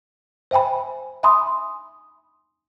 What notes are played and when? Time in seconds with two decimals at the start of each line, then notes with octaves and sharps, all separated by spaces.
0.51 C5 E5 G5 G#5 B5
1.23 E5 G#5 B5 C6 D#6